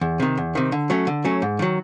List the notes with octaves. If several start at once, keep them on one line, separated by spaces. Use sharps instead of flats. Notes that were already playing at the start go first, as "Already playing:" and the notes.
E2
C3 D#3
E2
C3 D#3
D3
F#3 A3 C#4
D3
F#3 A3 C#4
G#2
D#3 F#3